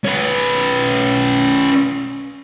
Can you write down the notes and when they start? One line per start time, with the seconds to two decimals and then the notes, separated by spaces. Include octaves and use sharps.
0.04 C#4 B4